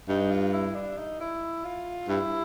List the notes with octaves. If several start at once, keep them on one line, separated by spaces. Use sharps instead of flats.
G2 D#4
F4
E4
D4
D#4
E4
F4
G2 E4